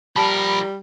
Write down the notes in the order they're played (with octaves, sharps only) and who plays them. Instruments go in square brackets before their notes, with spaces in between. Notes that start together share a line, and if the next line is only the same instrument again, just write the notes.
[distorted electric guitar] F3 A#4 [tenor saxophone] G3 [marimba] A5 [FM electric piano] B5